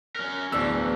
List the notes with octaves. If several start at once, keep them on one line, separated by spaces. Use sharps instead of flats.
C#4 A#4
D1 E2 D4 E6